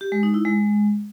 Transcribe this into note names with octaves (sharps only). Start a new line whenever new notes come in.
G4
G#3
D#4
E4
G#3